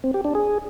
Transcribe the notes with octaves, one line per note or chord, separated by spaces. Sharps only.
C4
G4
D4
G#4